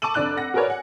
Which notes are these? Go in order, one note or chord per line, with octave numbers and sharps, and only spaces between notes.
A5 C#6 D6 E6 D#7 F#7
F1 D4 D5 F#6 F#7
F#5 A#6
F#4 G#4 A#4 B4 C#5 D5
F#5 G#5